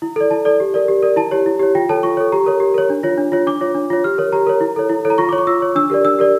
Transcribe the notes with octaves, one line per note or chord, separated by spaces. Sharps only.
E4
A4 D5
E4 A5
A4 D5
G4
A#4 D5
G4
A#4 D5
E4 A5
G4 C#5
E4
G4 C#5
F4 G5
A4 C#5 A5
F4 C#6
A4 C#5
G4 A#5
A#4 C#5
G4
A#4 C#5
D4
F4 C#5
D4
F4 C#5
D4 D6
F4 C#5
D4
F4 C#5
G4 F6
A#4 C#5
G4 A#5
A#4 C#5
E4
A4 C#5
E4
A4 C#5
A#5
F4 C#6
D6
C#5
C#6
F4 E6
C#5
D4 E6
G4 A#4 D5
D4 E6
G4 A#4 D5